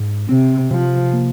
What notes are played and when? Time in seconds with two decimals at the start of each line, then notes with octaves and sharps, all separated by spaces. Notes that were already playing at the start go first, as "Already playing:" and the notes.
Already playing: G#2
0.28 C3 C4
0.71 C3 F3
1.13 A#3